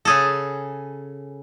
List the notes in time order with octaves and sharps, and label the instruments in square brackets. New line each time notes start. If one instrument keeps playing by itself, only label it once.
[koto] C#3 G#4 A4